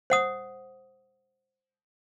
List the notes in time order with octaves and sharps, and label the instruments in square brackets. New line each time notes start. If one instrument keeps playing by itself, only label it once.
[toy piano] C5 F#5 D#6